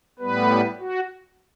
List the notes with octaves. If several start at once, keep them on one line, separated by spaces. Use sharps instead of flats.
A2 G3 B3 B4
F#4